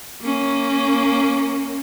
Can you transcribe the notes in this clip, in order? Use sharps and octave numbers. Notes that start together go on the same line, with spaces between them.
A#3 C#4